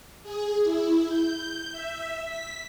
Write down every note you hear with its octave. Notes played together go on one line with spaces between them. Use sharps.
G#4
E4
G6
E5
B6